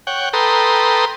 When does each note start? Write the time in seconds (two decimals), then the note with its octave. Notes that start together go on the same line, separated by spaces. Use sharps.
0.07 C#5 F#5 G5
0.33 A4 B4 G5 A#5 C6 D#6